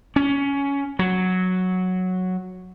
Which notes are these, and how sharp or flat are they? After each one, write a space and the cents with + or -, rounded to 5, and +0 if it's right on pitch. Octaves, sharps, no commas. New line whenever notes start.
C#4 +15
F#3 -5